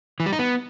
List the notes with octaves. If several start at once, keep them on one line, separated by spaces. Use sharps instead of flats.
E3
G3
D#4
B3